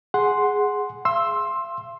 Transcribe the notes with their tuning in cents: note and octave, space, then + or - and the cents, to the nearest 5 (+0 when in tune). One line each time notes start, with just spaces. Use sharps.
G#4 +0 F#5 +0 C6 +0
F5 -45 C6 +15 E6 +0